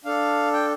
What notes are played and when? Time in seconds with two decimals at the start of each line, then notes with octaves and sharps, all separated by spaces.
0.05 D4 A4 F5
0.53 G5